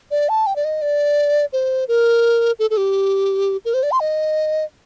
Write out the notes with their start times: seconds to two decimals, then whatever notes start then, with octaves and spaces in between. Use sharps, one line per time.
0.11 D5
0.29 A5
0.47 G5
0.56 D5
0.65 D#5
0.82 D5
1.53 C5
1.88 A#4
2.59 A4
2.70 A4
2.77 G4
3.65 A#4
3.74 C5
3.83 D5
3.92 C6
4.01 D#5